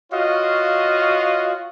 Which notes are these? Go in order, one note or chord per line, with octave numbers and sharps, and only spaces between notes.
F4 F#4 C#5 D#5 F5